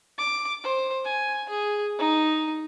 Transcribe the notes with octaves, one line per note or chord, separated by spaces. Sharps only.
D6
C5
G#5
G#4
D#4